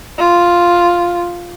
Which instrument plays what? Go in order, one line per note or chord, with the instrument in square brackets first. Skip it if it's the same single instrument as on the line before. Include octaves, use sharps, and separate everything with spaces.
[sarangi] F4